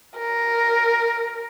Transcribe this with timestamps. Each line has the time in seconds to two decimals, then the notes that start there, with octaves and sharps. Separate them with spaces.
0.18 A#4